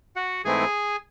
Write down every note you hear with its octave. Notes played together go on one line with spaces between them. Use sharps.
F#4 F#5
G#2 E3 A3 C4 E4 G#4 G#5